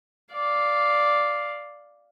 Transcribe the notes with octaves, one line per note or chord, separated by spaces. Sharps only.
D5 F5